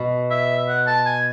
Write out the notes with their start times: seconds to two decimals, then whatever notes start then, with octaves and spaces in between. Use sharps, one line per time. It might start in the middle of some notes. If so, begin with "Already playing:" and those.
Already playing: B2
0.31 E5
0.68 F#5
0.87 A5
1.06 G#5